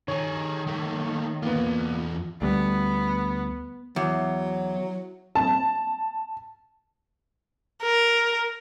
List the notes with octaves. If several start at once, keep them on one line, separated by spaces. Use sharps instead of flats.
D#3 G#4 A4 C#5
A3 A#3
E2 A#3 B3 F4
D2 G3 B3
E2 F#3
A5
A#4